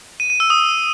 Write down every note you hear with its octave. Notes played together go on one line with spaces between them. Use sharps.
D#7
D#7
E6
D#6